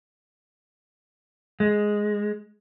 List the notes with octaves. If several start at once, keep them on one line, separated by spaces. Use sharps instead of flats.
G#3